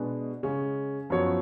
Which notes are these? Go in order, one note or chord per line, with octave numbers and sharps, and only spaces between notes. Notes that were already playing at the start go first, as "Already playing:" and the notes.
Already playing: B2 G#3 D4 G#4 B4
C#3 G#3 C#4
F#2 F3 B3 F#4 C#5